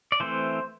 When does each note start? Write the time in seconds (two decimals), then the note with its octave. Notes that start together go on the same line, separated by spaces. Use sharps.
0.12 D5
0.20 E3 A3 C4 C5